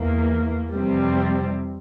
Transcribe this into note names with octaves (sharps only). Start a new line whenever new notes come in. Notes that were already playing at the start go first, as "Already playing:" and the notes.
Already playing: E2 E3 A#3
F2 C3 E3 G3 C4